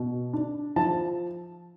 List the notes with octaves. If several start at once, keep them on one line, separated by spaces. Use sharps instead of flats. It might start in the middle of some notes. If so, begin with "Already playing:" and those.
Already playing: B2
D4
F3 A5